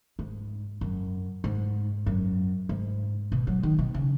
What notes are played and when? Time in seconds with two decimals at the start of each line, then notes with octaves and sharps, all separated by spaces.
0.19 G#2
0.81 F#2
1.44 G#2
2.06 F#2
2.69 G#2
3.32 B2
3.47 F#3
3.63 D#3
3.79 B2
3.94 C#3